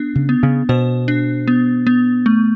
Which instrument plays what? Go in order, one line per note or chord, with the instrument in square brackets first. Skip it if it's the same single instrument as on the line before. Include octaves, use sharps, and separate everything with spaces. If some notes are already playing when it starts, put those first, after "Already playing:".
Already playing: [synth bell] B3 D4
[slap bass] C#3
[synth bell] B3
[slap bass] C#3
[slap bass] B2 [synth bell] C5
[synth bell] D4
B3
B3
A3